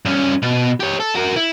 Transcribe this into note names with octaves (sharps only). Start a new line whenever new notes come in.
G2 C#4
B2
G4 C#5
A4
F#4 A#4
E4